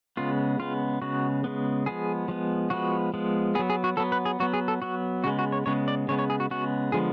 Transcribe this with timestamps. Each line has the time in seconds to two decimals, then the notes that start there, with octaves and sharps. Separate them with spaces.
0.17 C#3 G#3 B3 F4
0.59 C#3 G#3 B3 F4
1.02 C#3 G#3 B3 F#4
1.44 C#3 G#3 B3
1.86 F3 G#3 B3 G#4
2.28 F3 G#3 B3
2.70 F3 G#3 B3 F#4
3.14 F3 G#3 B3
3.55 B3 G#4
3.59 F#3
3.70 G#4
3.84 F#4
3.97 F#3 B3 A4
4.12 B4
4.25 G#4
4.40 F#3 B3 F#4
4.53 G#4
4.68 A4
4.82 F#3 B3 F#4
5.24 C#3 G#3 B3 F#4
5.39 F#4
5.52 C#5
5.66 C#3 G#3 B3 C#5
5.88 D5
6.08 C#3 G#3 B3 C#5
6.19 C#5
6.30 G#4
6.40 F#4
6.51 C#3 G#3 B3 F#4
6.92 D3 F3 G#3 B3 G#4